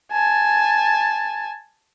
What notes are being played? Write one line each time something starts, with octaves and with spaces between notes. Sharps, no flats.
G#5 A5